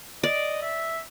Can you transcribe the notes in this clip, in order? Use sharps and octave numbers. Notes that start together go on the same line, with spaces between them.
D5 D#5
E5